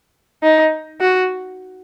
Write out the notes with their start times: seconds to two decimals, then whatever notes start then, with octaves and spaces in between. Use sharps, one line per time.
0.43 D#4
1.01 F#4